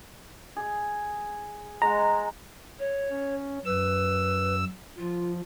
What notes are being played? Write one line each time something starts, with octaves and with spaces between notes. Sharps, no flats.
G#4
G#3 F#5 A#5
C#5
C#4
F#2 B4 E6
F3 F4